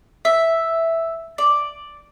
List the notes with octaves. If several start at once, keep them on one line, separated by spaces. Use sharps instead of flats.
E5
D5